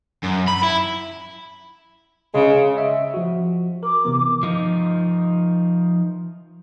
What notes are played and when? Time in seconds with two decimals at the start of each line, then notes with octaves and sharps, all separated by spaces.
0.24 F#2
0.48 B5
0.63 E4
2.34 C#3 G#3
2.77 D#5 E5
3.14 F3 F#4
3.83 A#4 D6
4.05 C3 E3 B3
4.43 F3 D#4